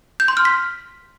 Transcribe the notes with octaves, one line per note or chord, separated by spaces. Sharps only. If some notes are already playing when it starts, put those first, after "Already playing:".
G6
C6
F6
B6